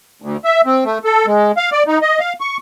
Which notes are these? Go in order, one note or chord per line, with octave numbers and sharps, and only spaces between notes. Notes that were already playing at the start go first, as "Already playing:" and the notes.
D2
E5
C4
A3
A4
G#3
F5
D5
D#4
D#5
F5
C#6